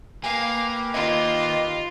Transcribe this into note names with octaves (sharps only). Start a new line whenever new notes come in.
A#3 G4 B4 F5 G#5
D#3 A#3 F4 D#5